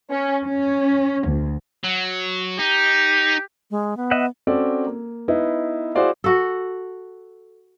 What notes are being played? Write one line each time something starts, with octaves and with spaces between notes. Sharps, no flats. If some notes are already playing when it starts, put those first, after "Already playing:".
C#4
C#4
D2
F#3
D#4 G4
G#3
B3
D#5 E5 F#5
C4 C#4 F#4 A4 D5
A#3
B3 D#4 E4 B4
E4 F#4 G#4 C5 D5 F5
F#4 A4